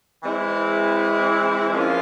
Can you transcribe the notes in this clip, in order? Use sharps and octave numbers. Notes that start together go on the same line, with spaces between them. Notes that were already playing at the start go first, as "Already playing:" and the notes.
E3 G#3 C4 E4
F3 A#3 C#4 F4